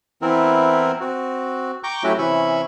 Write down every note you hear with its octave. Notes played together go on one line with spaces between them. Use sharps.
E3 B3 C4 E4 A#4
C4 F#4
G5 A#5 C#6 D6 G6
F#3 A3 C#4 E4 F#4 G4
C3 E3 C#4 E4 B5 C#6